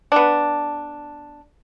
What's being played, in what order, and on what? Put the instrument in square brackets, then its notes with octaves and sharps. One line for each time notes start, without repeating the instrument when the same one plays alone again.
[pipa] B3 D4